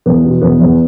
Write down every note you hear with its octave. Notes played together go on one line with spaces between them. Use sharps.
E2 B3
B2
E2 B3
E2